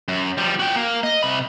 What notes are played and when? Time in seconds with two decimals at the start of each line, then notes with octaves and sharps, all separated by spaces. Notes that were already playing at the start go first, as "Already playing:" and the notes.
0.08 F#2
0.37 F3 G3
0.59 F#4 G5
0.75 A#3
1.03 D#5
1.23 C3 B5